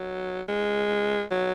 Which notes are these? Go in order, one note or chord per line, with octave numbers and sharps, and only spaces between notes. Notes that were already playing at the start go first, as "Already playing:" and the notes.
Already playing: F#3
G#3
F#3